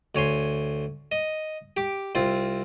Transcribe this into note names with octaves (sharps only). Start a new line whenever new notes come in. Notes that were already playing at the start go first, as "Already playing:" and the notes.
D2 C#5 G#5 C6
D#5
G4 D6
C2 C4 F4